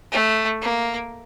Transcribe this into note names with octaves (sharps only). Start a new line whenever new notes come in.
A3
A#3